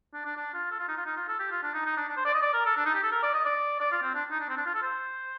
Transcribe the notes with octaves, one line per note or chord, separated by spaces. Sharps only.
D4
D4
D4
F4
A4
F4
D#4
F4
D#4
F4
A4
G4
F4
D4
D#4
D#4
D4
D4
C5
D5
D#5
D5
A#4
A4
D4
D#4
G4
A4
A#4
D5
D#5
D5
D5
F4
C4
D4
D#4
D4
C4
D4
F4
A4
C5